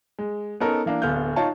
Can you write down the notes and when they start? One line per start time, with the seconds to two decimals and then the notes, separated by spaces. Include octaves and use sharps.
0.19 G#3
0.60 B3 C#4 D#4 A4 A#4
0.86 E3 A#3 D4
1.02 D1 D3 B3 F5 F6 G6
1.36 D#4 F4 C#5 A5